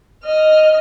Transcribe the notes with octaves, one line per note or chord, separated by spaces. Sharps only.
D#5 F6